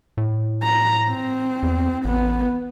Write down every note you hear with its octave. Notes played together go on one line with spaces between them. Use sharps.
A2
A#5
C4
E2
A1 B3